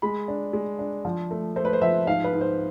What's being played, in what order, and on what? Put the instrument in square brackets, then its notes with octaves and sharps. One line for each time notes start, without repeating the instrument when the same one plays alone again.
[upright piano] G#3 [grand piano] B5
[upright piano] D4
G#3
D4
F3
A3
[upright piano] A3 [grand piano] C5
[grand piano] B4
C5
[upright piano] F3 [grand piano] E5
[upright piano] G#2 [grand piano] F5
[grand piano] B4
[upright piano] G#2
[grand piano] C5